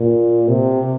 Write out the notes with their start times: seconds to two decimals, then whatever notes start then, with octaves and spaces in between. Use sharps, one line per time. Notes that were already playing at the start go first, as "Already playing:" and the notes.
Already playing: A#2
0.48 C3